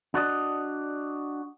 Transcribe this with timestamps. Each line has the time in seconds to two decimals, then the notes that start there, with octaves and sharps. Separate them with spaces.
0.14 D4 F#4 D5 D#5